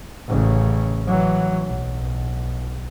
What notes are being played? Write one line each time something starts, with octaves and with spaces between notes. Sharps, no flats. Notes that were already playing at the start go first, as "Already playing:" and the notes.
A1 C#3
E3 F#3
B1